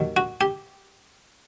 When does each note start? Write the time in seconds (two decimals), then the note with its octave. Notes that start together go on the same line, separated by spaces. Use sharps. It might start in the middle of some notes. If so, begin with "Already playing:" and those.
Already playing: D#2 D#3 F#3
0.17 F#4
0.41 G4